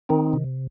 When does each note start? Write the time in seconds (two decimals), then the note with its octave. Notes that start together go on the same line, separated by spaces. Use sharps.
0.09 D#3 C4 D#4
0.33 C3